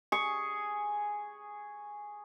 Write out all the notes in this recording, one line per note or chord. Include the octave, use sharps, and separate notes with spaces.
G#4 C#6